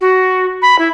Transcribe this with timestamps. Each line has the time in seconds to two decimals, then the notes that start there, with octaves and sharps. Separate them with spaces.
0.01 F#4
0.62 B5
0.78 E4